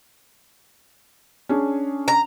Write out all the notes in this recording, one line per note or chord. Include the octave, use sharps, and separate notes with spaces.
C#4 D4 G#4
A#5